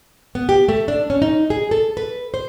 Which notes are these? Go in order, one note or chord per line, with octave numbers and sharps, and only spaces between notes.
B3
G4
A3
D4
C#4
D#4
G#4
A4
B4
C5